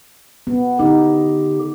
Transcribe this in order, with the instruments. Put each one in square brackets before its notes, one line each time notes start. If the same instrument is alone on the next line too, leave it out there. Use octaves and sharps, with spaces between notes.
[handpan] B3
[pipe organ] D3 G4 [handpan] D#4